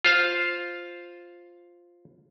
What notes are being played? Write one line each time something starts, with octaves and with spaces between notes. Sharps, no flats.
F4 C5 F5